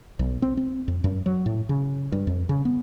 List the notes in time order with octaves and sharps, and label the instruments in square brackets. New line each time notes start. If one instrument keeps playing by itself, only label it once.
[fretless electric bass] B1
C4
C4
F2
F#2
F#3
A2
C#3
G2
F2
C#3
B3